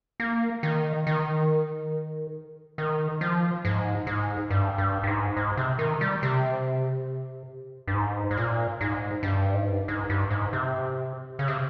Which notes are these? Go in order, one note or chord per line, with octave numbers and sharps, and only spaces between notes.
A#3
D#3
D#3
D#3
F3
G#2
G#2
G2
G2
G2
G#2
G#2
C3
D#3
G3
C3
G2
G#2
G#2
A#2
G#2
G2
G#2
G2
G#2
G2
G#2
C3
C#3
C3